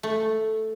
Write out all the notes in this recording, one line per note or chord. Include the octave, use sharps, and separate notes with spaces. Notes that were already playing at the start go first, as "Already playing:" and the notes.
A3